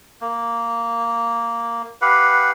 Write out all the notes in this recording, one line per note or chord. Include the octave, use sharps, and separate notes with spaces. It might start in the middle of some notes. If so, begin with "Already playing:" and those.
A#3
G4 B4 F5 F#5